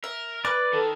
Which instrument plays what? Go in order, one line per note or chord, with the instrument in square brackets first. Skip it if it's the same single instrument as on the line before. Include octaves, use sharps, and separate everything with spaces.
[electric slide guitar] A#4 [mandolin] E5
[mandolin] B4 [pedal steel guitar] D5
[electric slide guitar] D#3 [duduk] A4